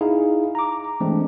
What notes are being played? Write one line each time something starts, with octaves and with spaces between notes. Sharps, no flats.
D#4 E4 G#4 F5
A#5 D6
E3 G#3 A3 C4 D4